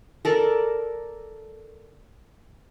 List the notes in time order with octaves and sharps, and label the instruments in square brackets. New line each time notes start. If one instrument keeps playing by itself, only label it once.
[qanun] A4 A#4 D5